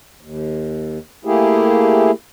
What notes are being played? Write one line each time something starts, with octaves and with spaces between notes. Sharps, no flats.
D#2
A3 A#3 E4 G4 G#4